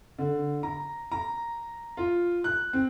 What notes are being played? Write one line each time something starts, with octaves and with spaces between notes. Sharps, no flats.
D3
A#5
A#5
F4
F#6
C4